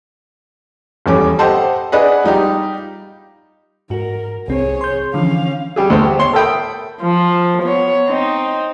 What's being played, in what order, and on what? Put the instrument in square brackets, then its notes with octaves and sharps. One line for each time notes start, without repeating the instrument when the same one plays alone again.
[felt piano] D#1 E2 G3 C#4 D6
G4 A4 C5 D#5 F#5 A5
D4 G#4 B4 D5 D#5 F#5
G3 D#4 F4 G4
[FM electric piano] G#2 F#4 [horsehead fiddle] A#4
[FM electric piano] C2 C4 [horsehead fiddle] G#4 C#5
[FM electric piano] C6 G6
[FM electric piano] D3 E3 F3 [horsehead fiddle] C#4 F5
[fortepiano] G3 G4 G#4
D2 B3 C5
G4
C#5 C6
A4 A#4 E5 G5 B5 D#6
[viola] F3
B3 C#5
C4 D#4